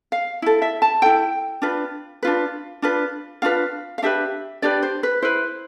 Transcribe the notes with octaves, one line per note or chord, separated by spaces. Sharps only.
F5
E4 A4
E5
A5
E4 A4 G5
D4 F4 B4
D4 F4 B4
D4 F4 B4
D4 F4 B4 F5
F5
D4 G4 B4 E5
D4 G4 B4 D5
C5
B4
E4 B4 C5